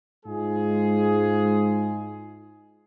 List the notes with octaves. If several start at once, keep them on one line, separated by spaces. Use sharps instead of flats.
G#2 G#3 F4 G#4